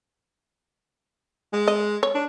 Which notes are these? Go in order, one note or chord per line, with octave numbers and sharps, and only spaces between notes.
G#3
D#5
C#5
D4